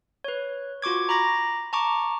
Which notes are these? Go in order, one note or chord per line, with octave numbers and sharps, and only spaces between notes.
B4 C#5
F4 F#4 C#6 D6 G#6
A#5 B5 D6 A#6
A5 A#5 C#6 D6